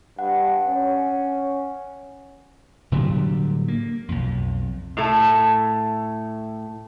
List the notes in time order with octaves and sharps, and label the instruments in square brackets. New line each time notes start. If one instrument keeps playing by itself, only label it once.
[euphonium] G2 [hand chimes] F#5
[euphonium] C#4
[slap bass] A2 D3 F#3 G3
A#3
B1 F2
[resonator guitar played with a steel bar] A2 A3